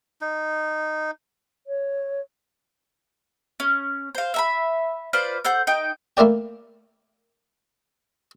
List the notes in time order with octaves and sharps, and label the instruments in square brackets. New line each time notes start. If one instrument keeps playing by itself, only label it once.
[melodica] D#4
[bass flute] C#5
[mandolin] C#4
C5 F5
E5 A#5 B5
F4 B4 C5 D5
A4 C5 F#5 G6
D#4 G5
[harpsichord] A3 A#3 E4 A#4 D5 G5